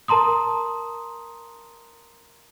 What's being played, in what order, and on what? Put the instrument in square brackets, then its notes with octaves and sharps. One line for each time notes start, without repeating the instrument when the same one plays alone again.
[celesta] A#4 A5 A#5 C6 D#6